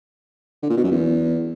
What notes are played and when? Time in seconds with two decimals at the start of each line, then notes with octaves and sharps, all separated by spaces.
0.63 D3
0.70 A#2
0.77 B2
0.84 F#2
0.91 E2